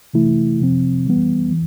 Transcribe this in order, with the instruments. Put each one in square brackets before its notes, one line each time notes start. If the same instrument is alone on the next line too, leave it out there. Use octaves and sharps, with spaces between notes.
[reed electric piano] C3 E3 A3 E4
C3 F3 C4
E3 G3 B3
E3